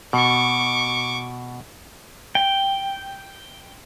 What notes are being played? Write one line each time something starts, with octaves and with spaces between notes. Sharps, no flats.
B2 C#6 D6
G5